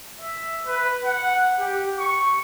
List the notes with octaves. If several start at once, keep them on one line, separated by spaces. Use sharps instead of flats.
E5
B4
F#5
G4
C#6